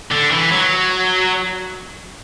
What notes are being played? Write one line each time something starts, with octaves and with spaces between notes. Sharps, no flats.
D3
E3
F#3